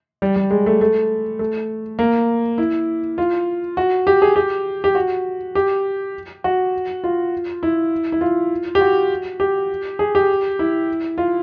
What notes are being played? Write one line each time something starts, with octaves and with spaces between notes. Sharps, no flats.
G3
G3
G#3
A3
A3
A3
A#3
E4
F4
F#4
G4
G#4
G4
G4
F#4
G4
F#4
F4
E4
E4
F4
G4
F#4
G4
G#4
G4
E4
F4